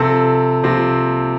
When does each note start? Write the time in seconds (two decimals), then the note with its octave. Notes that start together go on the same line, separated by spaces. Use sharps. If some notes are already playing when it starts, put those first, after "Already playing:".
Already playing: C3 F3 C4 A4
0.63 C3 F3 C4